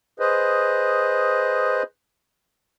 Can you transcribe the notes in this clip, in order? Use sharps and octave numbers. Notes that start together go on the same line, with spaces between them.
G#4 B4 C5 D#5